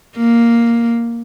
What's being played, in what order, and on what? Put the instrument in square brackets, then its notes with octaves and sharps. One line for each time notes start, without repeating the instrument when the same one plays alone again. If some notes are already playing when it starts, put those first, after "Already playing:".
[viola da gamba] A#3